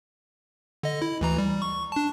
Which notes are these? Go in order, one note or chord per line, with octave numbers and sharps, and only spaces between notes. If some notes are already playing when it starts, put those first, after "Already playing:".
D3 D#5
E4
D2 E3 A#5
G3
C#6
D4 A5